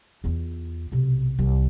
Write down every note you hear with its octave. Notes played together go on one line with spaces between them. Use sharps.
E2 F4
B1 C3
C2